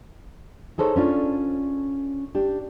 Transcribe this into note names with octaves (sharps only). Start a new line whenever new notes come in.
D#4 G#4 A4 C5 C#5
C#4 D4 F4
D4 G4